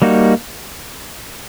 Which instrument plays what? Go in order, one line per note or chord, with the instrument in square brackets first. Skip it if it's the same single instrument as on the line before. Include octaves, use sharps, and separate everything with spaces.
[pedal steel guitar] G3 A#3 D#4 F#4